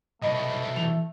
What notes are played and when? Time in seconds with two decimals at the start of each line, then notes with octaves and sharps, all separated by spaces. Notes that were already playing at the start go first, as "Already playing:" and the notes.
0.22 C2 B2 A3 D#5 B5
0.76 E3 F7